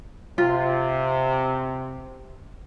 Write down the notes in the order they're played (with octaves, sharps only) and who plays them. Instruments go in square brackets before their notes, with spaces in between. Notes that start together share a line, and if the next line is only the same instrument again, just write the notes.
[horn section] C3 [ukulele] F4